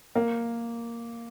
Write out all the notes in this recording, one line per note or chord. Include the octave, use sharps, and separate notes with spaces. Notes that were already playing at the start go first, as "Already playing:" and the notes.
A#3